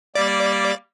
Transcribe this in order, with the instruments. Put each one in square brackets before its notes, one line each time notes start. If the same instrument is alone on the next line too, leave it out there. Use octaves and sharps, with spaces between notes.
[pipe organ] G3 A#3 G4 [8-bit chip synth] D5